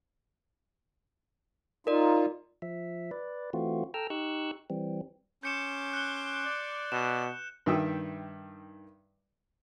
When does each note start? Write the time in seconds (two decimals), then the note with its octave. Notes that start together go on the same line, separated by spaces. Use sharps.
1.87 D#4 F4 A#4 D5
2.62 F3 E5
3.11 B4 D5
3.53 E3 A3 C4 F4 F#4
3.94 A4 G5 A#5 E6 F6
4.10 D#4 G4 C#6 E6 F#6
4.70 E3 G3 C4
5.43 C#4 C6 D6 G6 C#7 E7
5.93 F#6 C#7 G7
6.45 D5
6.92 B2 E7
7.66 G2 D#3 E5 G5 D#6 E6